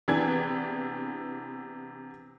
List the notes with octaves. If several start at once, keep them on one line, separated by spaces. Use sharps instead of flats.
C3 E3 B3 D4 G#4 G#6